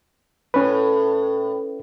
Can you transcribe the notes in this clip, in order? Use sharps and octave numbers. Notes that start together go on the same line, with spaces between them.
A2 C#4 B4